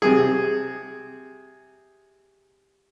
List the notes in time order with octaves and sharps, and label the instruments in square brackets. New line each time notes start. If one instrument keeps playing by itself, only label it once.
[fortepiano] C3 G#4